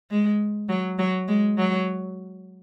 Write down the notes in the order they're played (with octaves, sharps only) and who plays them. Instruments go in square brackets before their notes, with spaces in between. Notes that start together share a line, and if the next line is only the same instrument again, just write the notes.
[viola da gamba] G#3
F#3
F#3
G#3
F#3